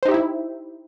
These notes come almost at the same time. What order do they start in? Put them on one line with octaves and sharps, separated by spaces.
C5 D#4 G4 E5 E4